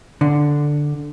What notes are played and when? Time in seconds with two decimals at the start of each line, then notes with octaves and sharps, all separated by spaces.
0.21 D3